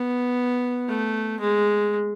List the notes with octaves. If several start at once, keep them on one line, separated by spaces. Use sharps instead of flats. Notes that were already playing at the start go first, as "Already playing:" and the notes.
Already playing: B3
A3
G#3